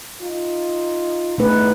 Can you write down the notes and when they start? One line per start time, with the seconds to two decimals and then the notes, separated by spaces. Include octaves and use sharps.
0.22 D#4 F4
1.38 E2 G2 A3 D#4 B4